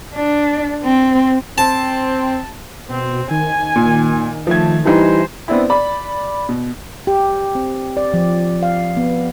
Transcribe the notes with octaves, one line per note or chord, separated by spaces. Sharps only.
D4
C4
C4 A5
B2 C4
D#3 G#5
A#2
F3 A3 G#6
E3 G3 D#4 E4 C5
B3 C4 D4 E4
D5 B5
B2
G4
C4
D5
F3
F5
B3